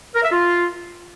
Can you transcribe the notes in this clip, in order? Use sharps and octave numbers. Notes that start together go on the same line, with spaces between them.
A#4
E5
F4